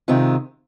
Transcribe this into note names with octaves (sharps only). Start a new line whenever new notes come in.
C3 D#3 G#3 C4 F4